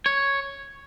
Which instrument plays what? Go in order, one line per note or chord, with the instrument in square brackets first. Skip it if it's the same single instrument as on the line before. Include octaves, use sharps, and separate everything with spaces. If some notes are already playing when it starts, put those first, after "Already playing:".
[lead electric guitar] C#5